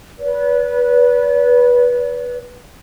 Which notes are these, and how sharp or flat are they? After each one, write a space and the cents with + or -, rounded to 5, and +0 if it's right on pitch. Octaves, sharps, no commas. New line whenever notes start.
B4 -15 D5 -45